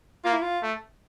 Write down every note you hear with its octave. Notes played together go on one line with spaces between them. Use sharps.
A#3 F4
E4
F4
A3